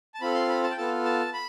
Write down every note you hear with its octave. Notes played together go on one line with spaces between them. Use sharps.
A5
C4 F4 A4 B5
C6
B5
A5
G5
B3 F4 A4 A5
A5
B5